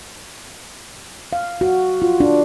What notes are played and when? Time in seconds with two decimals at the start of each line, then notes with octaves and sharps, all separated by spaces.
1.33 F5
1.61 F#4
2.02 F4
2.20 D4